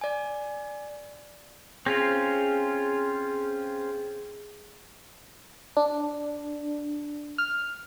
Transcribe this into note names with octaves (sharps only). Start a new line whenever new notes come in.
D5 G#5
C4 C#4 F4 G#4
D4
F6